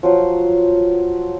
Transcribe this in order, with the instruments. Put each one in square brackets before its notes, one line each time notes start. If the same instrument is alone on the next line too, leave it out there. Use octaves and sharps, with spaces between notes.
[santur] F3 F#3 C6